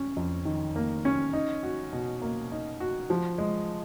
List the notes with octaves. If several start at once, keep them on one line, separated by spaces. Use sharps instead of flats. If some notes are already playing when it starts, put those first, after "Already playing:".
Already playing: C#4
F2
D#3
A#3
C#4
D#4
F#4
B2
A#3
D#4
F#4
F3
G#3